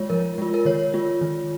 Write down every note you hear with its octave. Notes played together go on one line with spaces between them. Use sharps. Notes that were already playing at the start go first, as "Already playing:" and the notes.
Already playing: G#3 F4 C#5
F3 A#4
G#3 F4
A#4
D#3 C#5
G#3 F4
D#3